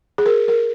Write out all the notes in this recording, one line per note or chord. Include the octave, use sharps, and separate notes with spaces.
G#4
A#4
A#4